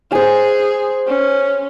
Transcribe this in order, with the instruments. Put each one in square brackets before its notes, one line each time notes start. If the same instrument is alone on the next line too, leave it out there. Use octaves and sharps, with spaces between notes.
[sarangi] G#4 [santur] C5 G#5
[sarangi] C#4